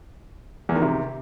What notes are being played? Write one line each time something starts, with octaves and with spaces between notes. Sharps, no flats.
E2
D#3
C3